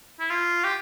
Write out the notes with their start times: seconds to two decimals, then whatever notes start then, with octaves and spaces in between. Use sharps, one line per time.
0.20 E4
0.30 F4
0.64 G4